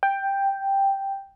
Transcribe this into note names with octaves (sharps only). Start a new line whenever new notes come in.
G5